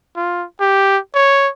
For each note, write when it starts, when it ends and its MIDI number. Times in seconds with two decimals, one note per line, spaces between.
0.16 0.44 65
0.60 0.98 67
1.15 1.49 73